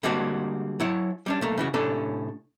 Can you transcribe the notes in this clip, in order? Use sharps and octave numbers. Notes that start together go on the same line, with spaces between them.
D3 G3 G#3 A#3 C4 F#4
F#3 E4 C#5
G3 C#4 D4
B1 A3 A#3
C#3 E3 F#4
A2 C3 C#4 D4 A4